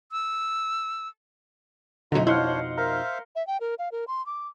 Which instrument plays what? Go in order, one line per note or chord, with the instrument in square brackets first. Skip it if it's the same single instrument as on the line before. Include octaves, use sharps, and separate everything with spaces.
[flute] E6
[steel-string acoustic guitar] F2 B2 D#4 [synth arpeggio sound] D3 F#3 [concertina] F4 E5 A#5
[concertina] D4 C5 C#5 [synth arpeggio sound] E4 [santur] F5 F#5 C6
[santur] A#4 [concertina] C5 E5 F5
[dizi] E5
G5
A#4
F5
A#4
C6
D6